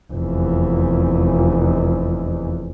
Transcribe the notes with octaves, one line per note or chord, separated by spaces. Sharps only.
F1 E2